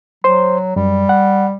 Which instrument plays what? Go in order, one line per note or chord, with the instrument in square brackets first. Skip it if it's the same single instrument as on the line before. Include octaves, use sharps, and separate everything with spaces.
[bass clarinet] F#3 [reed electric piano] C5 C6
[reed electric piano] F#2 [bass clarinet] G3
[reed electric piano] F#5